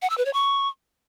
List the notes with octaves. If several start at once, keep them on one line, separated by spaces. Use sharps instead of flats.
F#5
E6
B4
C#5
C#6